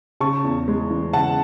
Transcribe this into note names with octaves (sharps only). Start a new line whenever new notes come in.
C#3 A5 C#6
E2
G#3
E3
C#3 F#5 A5